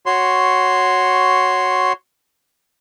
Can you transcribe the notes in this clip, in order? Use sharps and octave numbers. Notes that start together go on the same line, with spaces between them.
F#4 C#5 C6